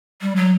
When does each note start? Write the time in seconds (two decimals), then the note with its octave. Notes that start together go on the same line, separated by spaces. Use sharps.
0.22 G3
0.36 F#3